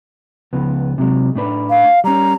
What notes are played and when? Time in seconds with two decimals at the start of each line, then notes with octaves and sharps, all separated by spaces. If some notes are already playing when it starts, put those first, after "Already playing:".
0.53 C#2 F3 B3
0.98 C3 F#3 G#3
1.35 A2 D4 B4
1.69 F5
2.04 G3 C#4 A#5